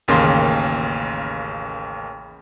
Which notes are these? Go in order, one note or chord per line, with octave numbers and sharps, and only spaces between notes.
A1 D#2 C#3 A#3 C#4 C6